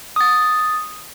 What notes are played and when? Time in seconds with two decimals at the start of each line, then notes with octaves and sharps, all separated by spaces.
0.16 D#6 A6